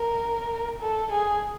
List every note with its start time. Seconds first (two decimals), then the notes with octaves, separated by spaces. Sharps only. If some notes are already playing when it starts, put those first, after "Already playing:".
Already playing: A#4
0.81 A4
1.12 G#4